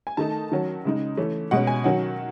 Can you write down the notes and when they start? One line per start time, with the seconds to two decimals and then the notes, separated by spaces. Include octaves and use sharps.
0.07 G#5
0.17 D#3 A3 D#4 A5
0.52 D#3 F#3 C#4
0.85 C#3 G#3 D#4
1.17 E3 A3 C#4
1.51 B2 G#3 C#4 F#5
1.67 G#5
1.84 D#3 F#3 C#4 F#5